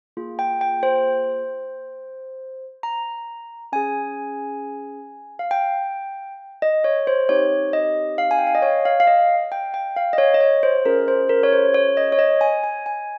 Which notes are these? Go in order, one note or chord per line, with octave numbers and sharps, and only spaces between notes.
A#3 F4 G#4
G5
G5
C5
A#5
C#4 G#4 G#5
F5
G5
D#5
C#5
C5
C4 D#4 G4 C#5
D#5
F5
G#5
G5
F5
D#5
C#5
F5
F5
D#5
G5
G5
F5
D#5
C#5
D#5
C#5
C5
C#4 F4 G#4 A#4
C5
A#4
C#5
C5
C#5
D#5
C#5
D#5
G#5
G#5
G#5